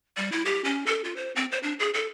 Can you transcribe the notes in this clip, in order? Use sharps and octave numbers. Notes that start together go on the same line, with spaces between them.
G3
E4
G4
C#4
A4
F4
C5
C4
C5
D4
G#4
A4